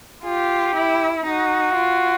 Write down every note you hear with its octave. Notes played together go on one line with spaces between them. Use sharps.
F4 G4
E4
D#4 F#4
F4